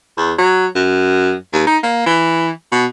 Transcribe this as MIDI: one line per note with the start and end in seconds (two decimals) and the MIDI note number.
0.17 0.33 40
0.39 0.66 54
0.75 1.34 42
1.53 1.64 39
1.67 1.78 63
1.83 2.02 58
2.06 2.51 52
2.72 2.86 47